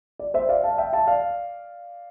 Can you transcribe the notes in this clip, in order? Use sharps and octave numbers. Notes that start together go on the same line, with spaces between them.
D5
C5 E5
D5 F5
F5 A5
E5 G5
F5 A5
D5 F5